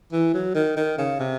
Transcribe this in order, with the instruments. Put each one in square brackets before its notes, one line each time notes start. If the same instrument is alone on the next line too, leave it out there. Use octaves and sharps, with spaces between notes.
[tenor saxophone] E3
F#3
D#3
D#3
C#3
C3